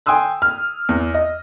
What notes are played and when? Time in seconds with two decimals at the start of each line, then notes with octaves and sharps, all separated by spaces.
0.06 G5 G#5 C6 D#6 E6 F#6
0.42 F6
0.89 E2
1.14 D#5